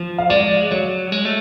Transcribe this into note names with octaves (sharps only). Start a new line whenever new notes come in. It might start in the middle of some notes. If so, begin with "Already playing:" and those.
Already playing: F3
F5
G#3 D5
F#3 C#5
G#3
A3